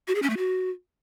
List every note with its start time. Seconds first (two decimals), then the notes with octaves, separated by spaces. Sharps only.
0.08 F#4
0.15 G#4
0.22 C#4
0.30 A3
0.37 F#4